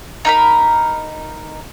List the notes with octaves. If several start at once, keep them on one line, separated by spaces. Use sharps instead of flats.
D#4 A#4 B5